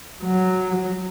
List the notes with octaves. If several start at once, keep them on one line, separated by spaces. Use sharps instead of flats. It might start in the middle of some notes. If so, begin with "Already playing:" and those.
F#3